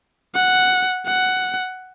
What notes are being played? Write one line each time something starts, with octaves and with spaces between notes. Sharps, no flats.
F#5
F#5